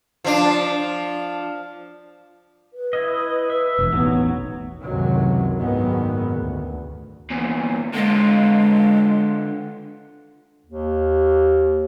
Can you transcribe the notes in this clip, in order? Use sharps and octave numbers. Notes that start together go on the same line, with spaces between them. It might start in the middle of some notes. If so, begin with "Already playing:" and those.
F3 D4
B4
E4 D#5
E5
E1
A1 F#3 B3 D#4
C#2 F#2 A2 C3 D#3 F#3
F#1 G#2 D#3 F#3 B3
D2
E2 A#2
D3 G#3 F4
D#2